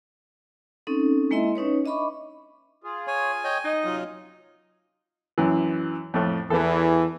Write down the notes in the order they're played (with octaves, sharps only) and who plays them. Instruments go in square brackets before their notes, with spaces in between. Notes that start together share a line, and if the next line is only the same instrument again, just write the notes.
[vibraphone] C4 C#4 D#4 A4
G#3 A#3 E4 D#5 E5 C6
C#4 D#4 B4 C#5
D4 D#5 E5 B5 C#6 D6
[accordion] F4 G#4
[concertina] C#5 [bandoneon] G#5
[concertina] C#5 D#5 G5
[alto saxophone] D#4 [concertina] D#5
[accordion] F#2 C3 [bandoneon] F#3 F4
[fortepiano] F#2 E3
F2 A2 A3
[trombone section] E2 E3 [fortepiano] A4 B4